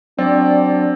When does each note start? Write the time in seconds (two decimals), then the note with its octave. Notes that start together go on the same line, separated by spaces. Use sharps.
0.18 F#3 C4 D4 D5